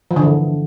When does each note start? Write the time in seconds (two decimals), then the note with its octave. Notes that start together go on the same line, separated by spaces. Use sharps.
0.11 F3
0.16 D3
0.22 E3